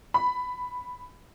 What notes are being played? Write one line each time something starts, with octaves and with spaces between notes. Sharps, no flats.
B5